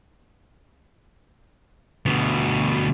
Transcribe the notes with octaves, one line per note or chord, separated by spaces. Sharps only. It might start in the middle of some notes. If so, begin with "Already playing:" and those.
D2 B2